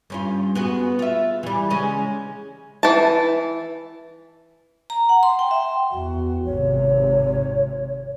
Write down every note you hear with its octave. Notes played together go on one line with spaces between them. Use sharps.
G2 C#4 F4
B3 F#4 G#4
F4 E5
E3 G3
C#3 G#3 C#4
E3 A5
A#5
F#5
C6
G5
E5
E2 F#4
G#1 C3 C#5